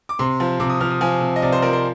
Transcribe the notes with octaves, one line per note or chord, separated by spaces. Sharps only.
D6
C3 C6
F3
C3 D6
D#6
F3 F6
D#6
F3 G#5
C3
D#5
C3 D5
C5
F3 A#4
C5